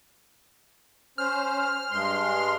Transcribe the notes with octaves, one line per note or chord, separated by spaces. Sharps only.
C#4 C5 F6
G2 G#3 C6